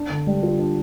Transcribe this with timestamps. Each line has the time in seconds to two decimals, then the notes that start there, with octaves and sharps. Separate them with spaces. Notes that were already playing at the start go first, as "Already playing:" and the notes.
Already playing: D4
0.10 D3
0.27 G3
0.43 F4
0.59 D4